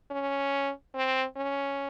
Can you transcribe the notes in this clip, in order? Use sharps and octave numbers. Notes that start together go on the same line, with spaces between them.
C#4
C4
C#4